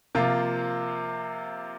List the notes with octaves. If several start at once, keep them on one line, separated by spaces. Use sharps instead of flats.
C3 F3 A#3 F4